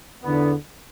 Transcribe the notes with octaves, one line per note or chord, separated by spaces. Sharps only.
E2 D3 B3